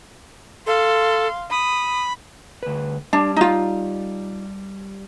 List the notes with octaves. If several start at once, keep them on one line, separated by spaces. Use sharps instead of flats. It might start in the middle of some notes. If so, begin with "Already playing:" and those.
A4 F5 C6
B5 D#6
D2 B4
G3 D4 A5
D#4 F4